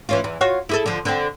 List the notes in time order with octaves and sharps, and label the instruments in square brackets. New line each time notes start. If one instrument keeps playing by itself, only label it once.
[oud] E3 C#4 F4
E2 E3
F4 F#4 C#5
E4 G#4 A4
D3 F3
D3 C4